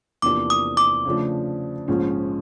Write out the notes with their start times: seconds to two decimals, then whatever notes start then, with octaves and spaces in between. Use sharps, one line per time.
0.22 E2 C3 F3 A#3 D4 D6
0.50 D#6
0.77 D6
1.05 C#3 F3 A3 D4
1.88 A#1 G#2 F3 G#3 C#4